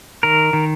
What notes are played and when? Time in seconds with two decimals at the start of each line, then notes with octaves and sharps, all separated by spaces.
0.23 D#3 A#4
0.53 D#3